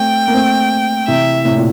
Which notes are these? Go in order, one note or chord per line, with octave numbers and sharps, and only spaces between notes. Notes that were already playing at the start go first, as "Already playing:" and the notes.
Already playing: A3 C4 G5
A#3
A3 C4
C3 E3 E5
A2 C3
A#2